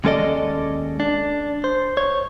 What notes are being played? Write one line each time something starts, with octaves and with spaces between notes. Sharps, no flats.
D#2 G#3 C#4 A4 D5 D#5
D4
C5
C#5